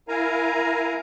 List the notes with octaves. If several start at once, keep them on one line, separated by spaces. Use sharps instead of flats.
E4 A#4 F5 G#5 A#5